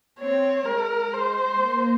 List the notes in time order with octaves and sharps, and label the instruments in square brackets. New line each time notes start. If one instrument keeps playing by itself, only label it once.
[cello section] C4 [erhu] C#5
[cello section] G#3 [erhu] A#4
[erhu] C5
[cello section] A#3